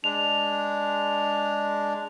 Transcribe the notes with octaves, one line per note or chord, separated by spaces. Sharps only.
G#3 D4 F7